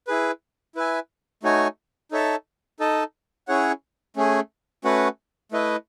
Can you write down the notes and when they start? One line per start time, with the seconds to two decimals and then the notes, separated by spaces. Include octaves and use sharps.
0.08 E4 G#4 B4
0.75 E4 B4 E5 G#5
1.43 A3 D#4 F#4 C#5 G#5
2.12 D#4 A4 C#5 E5 A5
2.80 D#4 A4 D#5 A5
3.48 C#4 E4 G#4 C#5 F#5
4.16 A3 C#4 G#4
4.84 A3 C#4 F#4 B4 F#5
5.52 A3 E4 B4 D#5